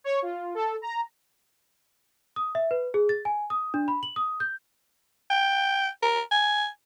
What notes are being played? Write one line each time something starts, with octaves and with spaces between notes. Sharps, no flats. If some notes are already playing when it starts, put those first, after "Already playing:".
C#5
F4
A4
A#5
D#6
E5
B4
G#4
A6
G#5
D#6
D4
B5
F#7
D#6
G6
G5
A#4
G#5